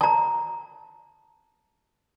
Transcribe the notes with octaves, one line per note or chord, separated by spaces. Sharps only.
A5 A#5